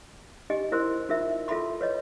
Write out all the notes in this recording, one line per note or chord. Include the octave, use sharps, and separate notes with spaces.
D#4 G4 D#5 G#5
E4 A#4 C5 C6
D#4 F4 A#4 E5
F4 A4 E5 A5 B5 C6
B4 C#5 D#5